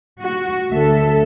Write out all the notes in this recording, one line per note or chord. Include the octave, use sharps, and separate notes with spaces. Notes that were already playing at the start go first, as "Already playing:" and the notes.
F#4
D2 A4 E5